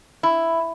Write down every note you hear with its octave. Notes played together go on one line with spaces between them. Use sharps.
E4